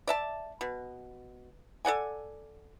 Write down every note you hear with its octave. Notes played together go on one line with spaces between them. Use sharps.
D5 E5 A5
B2
A4 D5 F#5 G#5